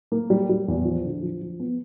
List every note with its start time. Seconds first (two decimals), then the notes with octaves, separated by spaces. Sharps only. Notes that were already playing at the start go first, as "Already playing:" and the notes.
0.12 A#3
0.30 G3
0.49 G3
0.68 E2
0.85 F3
1.05 D3
1.22 F3
1.41 F3
1.60 B3